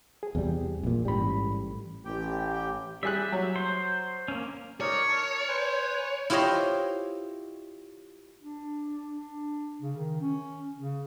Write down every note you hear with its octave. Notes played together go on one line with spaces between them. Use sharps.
G#4
E2 C3 G3
A#1 A#2
A1 G#2 G3 B5
A1 G4 G5
G3 G#4 E5 F#6
F#3
C5
A#3 C#4
D#4 A#4 C#5 D5
A#4 A5
B4 C5 G#5
E4 F4 G4 C5 C#5 D#5
D4
D4
C#3
D#3
C#4
C#3